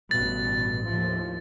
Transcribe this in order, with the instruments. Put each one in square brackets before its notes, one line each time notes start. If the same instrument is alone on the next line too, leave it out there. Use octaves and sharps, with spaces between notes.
[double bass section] A1 G2 B2 [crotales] A6
[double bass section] D#2 A2 F3